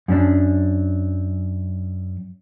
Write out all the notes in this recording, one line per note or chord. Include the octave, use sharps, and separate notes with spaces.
F#2 C#4 D4